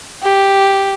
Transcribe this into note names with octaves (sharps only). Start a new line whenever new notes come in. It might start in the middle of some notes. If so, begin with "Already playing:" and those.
G4